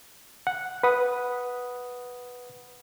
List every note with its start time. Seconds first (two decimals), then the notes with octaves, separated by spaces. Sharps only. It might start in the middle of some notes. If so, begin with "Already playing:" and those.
0.47 F#5
0.83 B4 F#5 D#6